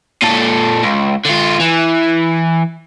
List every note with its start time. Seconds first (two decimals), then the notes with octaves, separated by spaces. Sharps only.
0.22 A#2 A4
0.83 C#2
1.26 D3 F4
1.60 E3